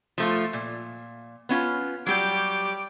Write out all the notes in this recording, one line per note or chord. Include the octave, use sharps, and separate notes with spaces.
F3 A3 F4
A#2
B3 C#4 F4
F#3 G3 G4 D6